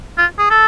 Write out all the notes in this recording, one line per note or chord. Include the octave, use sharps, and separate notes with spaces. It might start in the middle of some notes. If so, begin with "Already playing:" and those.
F4
G#4
A4